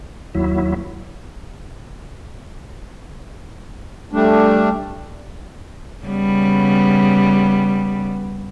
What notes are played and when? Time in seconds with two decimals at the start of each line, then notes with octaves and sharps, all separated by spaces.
0.35 D#2 F#3 E4
4.12 G3 A3 D4
6.06 C#3 G3 B3